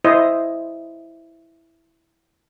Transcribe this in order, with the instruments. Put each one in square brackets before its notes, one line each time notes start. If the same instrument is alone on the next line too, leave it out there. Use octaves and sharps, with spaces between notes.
[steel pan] E4 C5 D#5